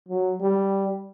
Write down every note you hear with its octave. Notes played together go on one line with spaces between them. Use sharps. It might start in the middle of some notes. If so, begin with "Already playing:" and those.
F#3
G3